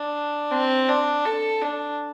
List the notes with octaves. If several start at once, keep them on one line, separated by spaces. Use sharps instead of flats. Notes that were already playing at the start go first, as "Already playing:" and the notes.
Already playing: D4
C4
D4
A4
D4